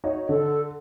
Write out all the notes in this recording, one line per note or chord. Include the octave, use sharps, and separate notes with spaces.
D#4 F#4 C#5
D3 A4